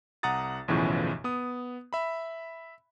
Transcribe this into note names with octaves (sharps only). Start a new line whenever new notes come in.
C2 F#5 A#5 D#6 A6
B1 E2 A2 C#3 E3 F3
B3 D#6
E5 B5